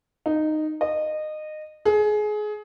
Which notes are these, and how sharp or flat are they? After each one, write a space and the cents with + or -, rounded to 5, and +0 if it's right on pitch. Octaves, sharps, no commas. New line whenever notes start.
D#4 -10
D#5 -20
G#4 +25